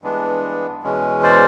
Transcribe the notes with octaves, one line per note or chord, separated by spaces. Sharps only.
G2 E3 G#3 B3 D4
E2 B2 G#3 C#4
C5 D5